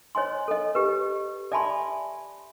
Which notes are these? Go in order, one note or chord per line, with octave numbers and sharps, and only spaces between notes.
C5 C#5 D#5 G#5 C6
A4 D#5
G4 B4
D5 E5 G#5 A5 B5 C6